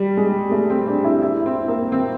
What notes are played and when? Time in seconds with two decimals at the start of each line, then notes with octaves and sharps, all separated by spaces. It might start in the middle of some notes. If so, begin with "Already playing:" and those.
Already playing: G3
0.17 G#3
0.51 A3
0.70 C4
0.87 D4
1.05 E4
1.22 E4
1.46 C4
1.68 A#3
1.92 C4